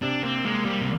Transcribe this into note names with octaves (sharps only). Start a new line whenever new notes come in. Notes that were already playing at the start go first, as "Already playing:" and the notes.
C3 D4
A#3 C4
G#3 A#3
G3 A#3
C3